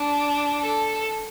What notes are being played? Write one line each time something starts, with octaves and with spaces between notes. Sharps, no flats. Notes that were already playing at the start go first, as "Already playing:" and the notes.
Already playing: D4
A4